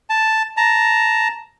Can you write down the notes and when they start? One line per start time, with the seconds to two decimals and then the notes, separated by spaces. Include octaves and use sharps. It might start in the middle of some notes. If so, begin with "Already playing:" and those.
0.10 A5
0.57 A5 A#5